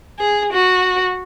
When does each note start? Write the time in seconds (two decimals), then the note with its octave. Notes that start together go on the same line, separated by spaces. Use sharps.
0.19 G#4
0.53 F#4